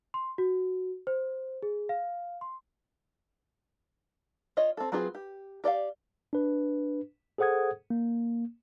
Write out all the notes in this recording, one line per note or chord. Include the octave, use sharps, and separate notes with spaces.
C6
F#4
C5
G#4
F5
C6
F4 C#5 D#5
C4 A4
F#3 C4 F4 G#4 B4
G4
G4 D5 D#5 F5
D4 B4
G#4 A4 C5 F#5 D#6 G#6
A#3